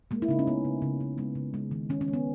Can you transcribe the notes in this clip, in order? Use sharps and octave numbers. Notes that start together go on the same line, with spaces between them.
G#3 A#3
E4
C#3 D#4
C#4
C#3 B3
C#3
C#3
C#3
G#3 B3
C#3
G#3
D#3
D#3 C#4
C#4
G#3
B3